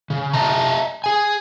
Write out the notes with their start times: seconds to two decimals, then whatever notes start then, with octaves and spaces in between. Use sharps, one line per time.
0.10 C#3
0.33 D#5 E5 A5 A#5
1.04 G#4 G#5